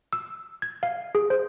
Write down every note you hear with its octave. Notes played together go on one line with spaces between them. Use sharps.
E6
G#6
F5
G#4
C5